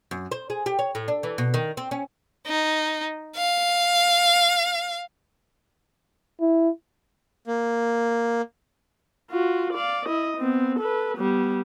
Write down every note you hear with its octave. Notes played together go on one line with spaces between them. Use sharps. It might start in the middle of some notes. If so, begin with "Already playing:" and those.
F#2
C5
G#4
G4
C#5
A2
D4
E3
B2
D#3
C4
C#4
D#4
F5
E4
A#3
F4 F#4
D5 F5
E4 D#5
B3 C4
A4 B4
G3 B3